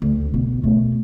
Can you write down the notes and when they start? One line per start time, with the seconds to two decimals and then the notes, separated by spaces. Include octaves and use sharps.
0.02 D2
0.30 B1 B2
0.63 B2 A3